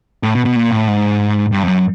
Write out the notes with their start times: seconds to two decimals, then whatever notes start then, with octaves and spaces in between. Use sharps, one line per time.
0.23 A2
0.34 B2
0.45 B2
0.56 A#2
0.71 A2
0.88 G#2
1.52 G2
1.63 F2
1.68 F#2